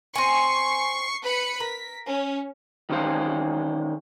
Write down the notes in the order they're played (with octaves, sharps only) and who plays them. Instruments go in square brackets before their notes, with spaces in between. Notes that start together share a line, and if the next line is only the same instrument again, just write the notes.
[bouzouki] C4 G#5 [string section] C#6 C7
[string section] B4 B5 C#7
[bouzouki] A#4 [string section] B6
[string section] C#4
[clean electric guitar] D#3 E3 C#4 C5 F5